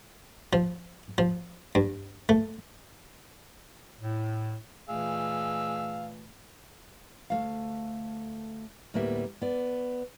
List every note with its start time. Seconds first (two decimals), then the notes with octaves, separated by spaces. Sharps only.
0.53 F3
1.18 F3
1.75 G2
2.29 A3
4.01 A2
4.89 A#2 E3 A3 G#4 F5 E6
7.30 D2 A3 F5
8.94 D2 A2 G3 A#3 B3 E5
9.42 B3 D5